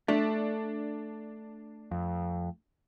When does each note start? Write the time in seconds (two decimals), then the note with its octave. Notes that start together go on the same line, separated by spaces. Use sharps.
0.08 A3 D4
1.91 F2